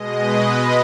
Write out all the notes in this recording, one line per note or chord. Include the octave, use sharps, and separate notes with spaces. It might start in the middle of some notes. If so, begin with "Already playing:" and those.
Already playing: B2 G#3 D#5
B4
B4